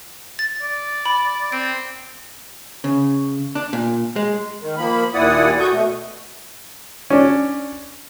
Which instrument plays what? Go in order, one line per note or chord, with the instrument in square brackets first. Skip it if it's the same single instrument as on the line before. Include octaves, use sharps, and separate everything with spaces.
[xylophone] A6
[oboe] D5
[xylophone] B5
[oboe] C4 [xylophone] D7
[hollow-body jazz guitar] C#3
D4
A#2
G#3
[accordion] D#3
F3 A#3 B5
D#2 A#2 E4 D5 F#5 D#6
F#4 A4 C#6 D#6 G6
B2 A3
[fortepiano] C#4 D4